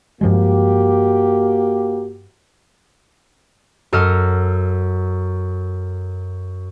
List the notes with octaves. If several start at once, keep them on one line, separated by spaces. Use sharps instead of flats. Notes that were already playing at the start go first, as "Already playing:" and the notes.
G2 F3 G#3 A#3 F#4 G4
F#2 A4 D#5 F6